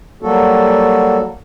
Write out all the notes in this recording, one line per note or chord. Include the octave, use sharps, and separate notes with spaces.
F#3 G3 A#3 F#4 A4